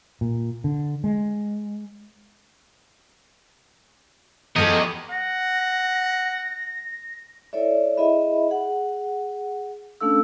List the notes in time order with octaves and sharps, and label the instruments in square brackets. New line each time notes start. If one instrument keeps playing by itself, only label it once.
[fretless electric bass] A#2
D3
G#3
[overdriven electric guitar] E2 [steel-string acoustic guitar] F3 G4 A4 [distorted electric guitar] C#4 A#4 [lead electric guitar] D#5
[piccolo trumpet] F#5 [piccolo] A#6
[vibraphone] E4 A4 C#5 D5 E5
E4 G#4 D#5 E5 B5
G#4 F#5
A3 C#4 D4 A4 F5 E6